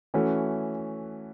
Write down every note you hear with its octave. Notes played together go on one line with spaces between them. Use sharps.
E3 A3 C#4 F#4